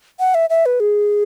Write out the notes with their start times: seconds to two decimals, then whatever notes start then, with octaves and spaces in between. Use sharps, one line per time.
0.20 F#5
0.35 E5
0.50 E5
0.66 B4
0.80 G#4